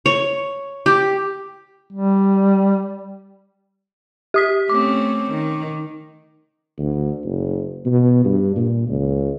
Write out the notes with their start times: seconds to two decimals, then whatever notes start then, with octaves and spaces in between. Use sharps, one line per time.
0.06 C#5
0.86 G4
1.93 G3
4.34 G4 D#6 B6
4.69 A3 C4 C#4 D6
5.30 D#3
6.79 D2
7.24 F#1
7.86 B2
8.25 G2
8.56 A#2
8.88 C#2